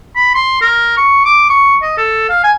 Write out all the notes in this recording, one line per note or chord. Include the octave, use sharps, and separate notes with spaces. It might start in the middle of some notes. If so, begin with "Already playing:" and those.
B5
C6
A#4
C#6
D6
C#6
D#5
A4
F5
G#5